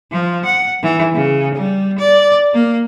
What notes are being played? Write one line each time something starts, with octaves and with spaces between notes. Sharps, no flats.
F3
F#5
E3
C#3
G3
D5
A#3